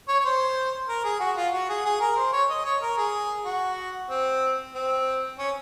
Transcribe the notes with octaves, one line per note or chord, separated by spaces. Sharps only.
C#5
C#5
C5
A#4
G#4
F#4
F4
F#4
G#4
G#4
A#4
C5
C#5
D#5
C#5
A#4
G#4
F#4
C4
C4
C#4